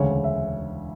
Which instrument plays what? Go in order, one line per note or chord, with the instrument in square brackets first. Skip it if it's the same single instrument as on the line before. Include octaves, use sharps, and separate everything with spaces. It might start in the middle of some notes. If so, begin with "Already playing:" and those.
Already playing: [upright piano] E1 D2 C#3 C#5
E5